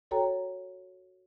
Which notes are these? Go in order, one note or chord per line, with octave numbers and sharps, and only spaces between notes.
F#4 A4 C#5 G5 A#5